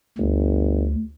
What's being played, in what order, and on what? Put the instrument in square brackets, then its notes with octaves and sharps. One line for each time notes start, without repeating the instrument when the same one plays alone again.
[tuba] G1 [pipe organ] D2